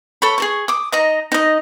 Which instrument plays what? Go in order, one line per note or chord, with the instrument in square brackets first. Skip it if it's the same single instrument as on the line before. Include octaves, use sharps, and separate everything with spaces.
[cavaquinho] A4 C#5 B5
G#4 A4 C#6
D6 D#6
D#4 D#5 A#5
D#4 D#5